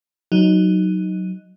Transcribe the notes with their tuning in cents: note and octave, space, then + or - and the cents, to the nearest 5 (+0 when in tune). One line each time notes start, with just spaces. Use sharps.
F#3 +0 D#4 +0